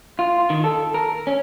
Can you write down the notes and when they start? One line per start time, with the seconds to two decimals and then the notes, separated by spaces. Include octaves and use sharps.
0.19 F4
0.50 D#3
0.64 A4
0.94 A#4
1.27 C#4